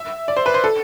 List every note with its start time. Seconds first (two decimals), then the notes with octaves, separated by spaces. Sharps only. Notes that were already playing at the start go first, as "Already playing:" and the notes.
Already playing: E5
0.28 D5
0.37 C5
0.46 B4
0.54 C5
0.64 A4